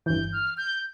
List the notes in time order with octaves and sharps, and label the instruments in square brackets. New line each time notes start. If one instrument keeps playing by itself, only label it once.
[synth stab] G1 G2 E3 [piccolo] G6
[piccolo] F6
G6